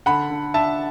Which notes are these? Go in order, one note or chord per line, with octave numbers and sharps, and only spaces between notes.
D3 F#5 B5
D3
D4 E5 A5